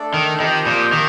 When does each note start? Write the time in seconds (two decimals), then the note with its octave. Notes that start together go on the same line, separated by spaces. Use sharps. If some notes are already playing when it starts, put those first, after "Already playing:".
Already playing: A3 D4 A4 D5
0.14 D#3
0.40 D#3 F3 C4 G4 C5 D#5
0.66 A#2
0.92 D#3